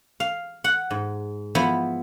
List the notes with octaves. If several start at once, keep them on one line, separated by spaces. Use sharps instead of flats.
F5
F#5
G#2
F3 B3 E4